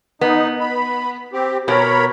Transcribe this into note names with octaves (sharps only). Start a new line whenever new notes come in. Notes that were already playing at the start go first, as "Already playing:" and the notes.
B3 D#4
B5
C4 G4
B2 A#4 C#5 B5